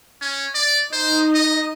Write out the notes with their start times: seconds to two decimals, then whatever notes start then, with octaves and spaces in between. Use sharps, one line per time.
0.22 C#4
0.55 D5
0.92 D#4 C5
1.34 D#5